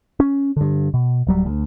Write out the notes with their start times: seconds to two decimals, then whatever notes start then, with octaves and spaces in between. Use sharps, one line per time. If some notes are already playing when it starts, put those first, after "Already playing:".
0.20 C#4
0.56 G2 D3
0.94 B2
1.27 D1 F#3 G3
1.46 D2